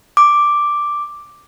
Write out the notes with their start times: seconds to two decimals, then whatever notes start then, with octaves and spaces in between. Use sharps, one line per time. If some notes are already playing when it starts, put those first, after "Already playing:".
0.17 D6